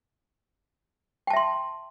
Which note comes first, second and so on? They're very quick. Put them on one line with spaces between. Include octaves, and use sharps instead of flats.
G5 A5 E5 C6